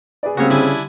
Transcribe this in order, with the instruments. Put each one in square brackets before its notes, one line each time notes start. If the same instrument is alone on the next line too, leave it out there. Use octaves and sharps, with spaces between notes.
[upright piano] G#4 B4 D5
[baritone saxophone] C#3 [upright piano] G3 A#3 G#4 [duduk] C4 [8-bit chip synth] F#4 C#5
[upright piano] D3 G3 D#7 [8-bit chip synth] D4 E4 G#5